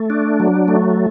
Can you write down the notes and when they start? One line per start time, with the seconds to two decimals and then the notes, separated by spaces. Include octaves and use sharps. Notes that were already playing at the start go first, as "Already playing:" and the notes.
Already playing: A3
0.10 D4
0.40 F#3
0.68 A3